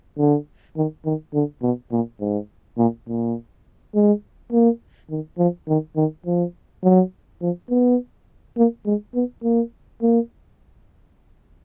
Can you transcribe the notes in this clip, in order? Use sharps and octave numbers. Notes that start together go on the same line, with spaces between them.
D3
D#3
D#3
D3
B2
A#2
G#2
A#2
A#2
G#3
A#3
D#3
F3
D#3
D#3
F3
F#3
F3
B3
A#3
G#3
B3
A#3
A#3